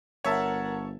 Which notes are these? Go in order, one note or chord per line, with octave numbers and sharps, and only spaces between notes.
G1 A#4 C#5 E5 F#5 A5